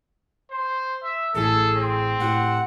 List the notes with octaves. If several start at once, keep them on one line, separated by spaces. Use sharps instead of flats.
C5
E5
A1 A2 G#4 A4
C4
A2 G4 F#5